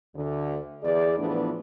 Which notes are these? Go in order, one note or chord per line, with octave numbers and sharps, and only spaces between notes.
D2 D3
E2 G#4 D5
A2 E3 F3 B3 D4